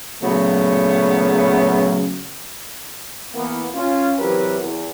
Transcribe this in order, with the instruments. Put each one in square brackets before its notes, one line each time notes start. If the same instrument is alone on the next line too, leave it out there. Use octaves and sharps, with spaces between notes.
[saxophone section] A#2 C#3 F#3 A3 B3
[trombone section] E3 A#3 B3
C#4 F4
C3 E3 F#3 G4 A#4 B4
E2